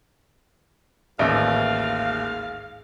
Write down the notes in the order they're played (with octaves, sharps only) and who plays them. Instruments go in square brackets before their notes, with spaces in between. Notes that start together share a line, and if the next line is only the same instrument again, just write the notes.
[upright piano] A1 D#2 [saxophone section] G#2 F5 [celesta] E5